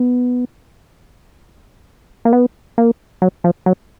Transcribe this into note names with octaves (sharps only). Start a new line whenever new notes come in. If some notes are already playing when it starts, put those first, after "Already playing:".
Already playing: B3
A#3
B3
A#3
F#3
F3
F#3